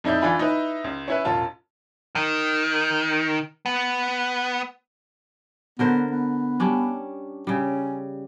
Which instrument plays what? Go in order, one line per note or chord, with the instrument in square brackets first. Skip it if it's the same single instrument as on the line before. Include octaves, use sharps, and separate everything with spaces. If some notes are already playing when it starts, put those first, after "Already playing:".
[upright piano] F2 D#4 E4 D5 G6
E3 D4 F4 G#5 B5
D#4 E4 B4
C#2
C#4 E4 B4
E1 A1 F4 A5
[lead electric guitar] D#3
B3
[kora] D3 A#4 C5 [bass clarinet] B3
[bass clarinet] B3
[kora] G3 C#4 D4
[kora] C#3 G3 [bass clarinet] C#4